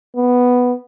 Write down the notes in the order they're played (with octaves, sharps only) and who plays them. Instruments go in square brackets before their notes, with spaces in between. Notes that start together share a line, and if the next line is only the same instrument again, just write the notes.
[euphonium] B3